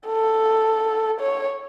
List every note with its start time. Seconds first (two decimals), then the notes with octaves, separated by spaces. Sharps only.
0.08 A4
1.21 C#5